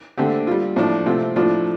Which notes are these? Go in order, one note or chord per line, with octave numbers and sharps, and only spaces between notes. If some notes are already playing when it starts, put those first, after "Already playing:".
D3 A3 C4 G4
G3 F4
A2 F3 D4
C3 A3 C4 F4
A2 F3 D4 F4